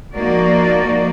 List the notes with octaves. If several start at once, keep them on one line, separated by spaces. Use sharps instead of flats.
F3 A#3 D#4 F#4 D5